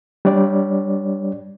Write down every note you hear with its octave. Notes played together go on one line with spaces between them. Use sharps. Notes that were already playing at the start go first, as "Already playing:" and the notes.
G3 D4 C#5 D5